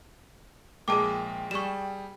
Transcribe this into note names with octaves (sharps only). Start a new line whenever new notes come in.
A#1 G#3 A#3 G#4 G5 A5 D6
G3 G#4 C#6 E7